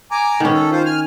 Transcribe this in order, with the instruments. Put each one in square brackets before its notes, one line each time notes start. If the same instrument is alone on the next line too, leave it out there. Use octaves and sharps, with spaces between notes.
[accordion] G#5 A#5 D6
[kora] D#3 C#4 [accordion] B3
[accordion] A4
F4 C5
G#5 F6